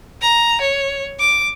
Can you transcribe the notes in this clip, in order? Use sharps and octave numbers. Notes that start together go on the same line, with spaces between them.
A#5
C#5
D6